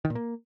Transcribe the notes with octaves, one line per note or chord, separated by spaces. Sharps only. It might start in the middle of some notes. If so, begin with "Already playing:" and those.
D#3
A#2
A#3